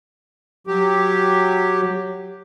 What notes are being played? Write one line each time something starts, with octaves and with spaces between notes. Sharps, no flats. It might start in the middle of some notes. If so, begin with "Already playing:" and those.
F#3 G4